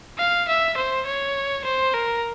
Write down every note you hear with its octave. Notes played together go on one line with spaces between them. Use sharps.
F5
E5
C5
C#5
C5
A#4